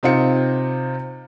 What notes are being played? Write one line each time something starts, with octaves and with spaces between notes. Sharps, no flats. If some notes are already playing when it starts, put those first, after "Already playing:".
C3 C4 D#4 F4 C#7